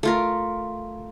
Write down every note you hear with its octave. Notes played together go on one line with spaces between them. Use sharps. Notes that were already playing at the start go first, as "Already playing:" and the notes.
A3 F4 A#4